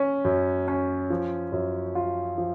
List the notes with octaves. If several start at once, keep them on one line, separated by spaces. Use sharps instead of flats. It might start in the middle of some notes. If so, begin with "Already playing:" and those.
Already playing: C#4
F#2
C#4
F3
F#2
F4
F3